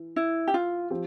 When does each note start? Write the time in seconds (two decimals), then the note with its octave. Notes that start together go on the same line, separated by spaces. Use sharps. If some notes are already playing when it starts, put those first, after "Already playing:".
Already playing: E3
0.16 E4
0.48 G4
0.54 F4
0.90 F3 C4 G4